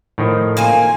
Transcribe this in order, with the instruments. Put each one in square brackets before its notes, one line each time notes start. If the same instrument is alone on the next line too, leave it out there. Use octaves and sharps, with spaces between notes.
[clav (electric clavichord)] A2 D#3 F3
[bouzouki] A#3 C4 G#5